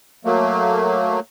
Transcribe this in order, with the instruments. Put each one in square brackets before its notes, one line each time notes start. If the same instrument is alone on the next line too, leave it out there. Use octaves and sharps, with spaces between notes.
[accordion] F#3 A3 A#3